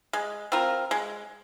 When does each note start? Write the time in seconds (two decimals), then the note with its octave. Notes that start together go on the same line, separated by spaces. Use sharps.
0.13 G#3
0.52 C4 F4 A#4
0.91 G#3